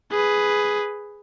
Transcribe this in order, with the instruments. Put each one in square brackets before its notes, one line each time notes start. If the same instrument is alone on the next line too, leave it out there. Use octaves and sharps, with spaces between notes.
[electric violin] G#4 B4